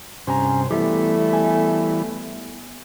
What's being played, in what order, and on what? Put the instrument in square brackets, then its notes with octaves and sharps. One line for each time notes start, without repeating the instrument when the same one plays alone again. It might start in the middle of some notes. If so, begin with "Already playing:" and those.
[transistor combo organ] G2 C3 C5 [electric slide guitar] C#4 G#5 A#5
[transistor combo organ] E3 G3 E4 [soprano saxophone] A3 [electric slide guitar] B3 G4
[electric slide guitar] B3 G#5